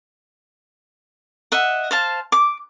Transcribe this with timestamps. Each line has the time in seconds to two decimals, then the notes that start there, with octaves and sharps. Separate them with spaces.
1.52 D#5 E5 F#5
1.91 C5 F5 A5
2.32 D6